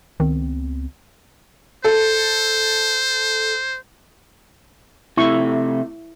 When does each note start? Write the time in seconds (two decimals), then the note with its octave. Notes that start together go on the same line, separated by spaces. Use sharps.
0.20 C#2 D#3 B3 C4
1.85 A4 C5
5.17 C3 A3 E4 C#6